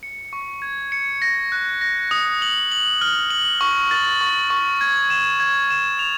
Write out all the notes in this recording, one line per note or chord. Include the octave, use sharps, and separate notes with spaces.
C#7
C#6
G#6
C#7
A#6
F#6
A#6
D#6
F#7
F#7
F6
F#7
C#6
A6
C#6
C#6
G#6
E7
G#6
E7
F7